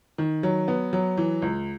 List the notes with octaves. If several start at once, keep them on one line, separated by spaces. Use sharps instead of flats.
D#3
F#3
B3
F#3
E3
C#2